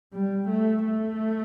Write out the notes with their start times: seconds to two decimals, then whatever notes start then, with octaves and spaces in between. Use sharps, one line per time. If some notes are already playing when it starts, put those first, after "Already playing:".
0.13 G3
0.49 A3
0.85 A3